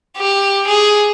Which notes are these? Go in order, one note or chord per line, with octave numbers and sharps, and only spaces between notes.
G4
G#4